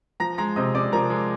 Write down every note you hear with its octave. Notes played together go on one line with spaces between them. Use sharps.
F3 A#5 A#6
G#3 A#5 A#6
C3 D#5 D#6
C3 D5 D6
F3 A#4 A#5
G#3